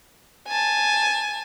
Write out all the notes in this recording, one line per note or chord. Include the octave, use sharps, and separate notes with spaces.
G#5 A5